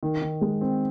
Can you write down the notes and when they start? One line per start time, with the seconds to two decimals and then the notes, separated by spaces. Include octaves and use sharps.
0.03 D#3
0.22 D#3
0.41 G#3
0.61 C4